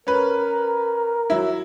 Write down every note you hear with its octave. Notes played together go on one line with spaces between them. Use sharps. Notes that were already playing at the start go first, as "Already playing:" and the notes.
C#4 A#4 B4
F#3 E4